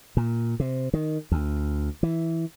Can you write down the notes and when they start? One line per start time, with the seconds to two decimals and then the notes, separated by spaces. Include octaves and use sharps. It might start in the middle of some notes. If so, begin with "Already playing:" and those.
0.17 A#2
0.60 C3
0.94 D#3
1.32 D2
2.03 E3